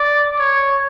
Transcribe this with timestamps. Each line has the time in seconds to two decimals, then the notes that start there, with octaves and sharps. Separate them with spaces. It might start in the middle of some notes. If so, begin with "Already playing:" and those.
Already playing: D5
0.39 C#5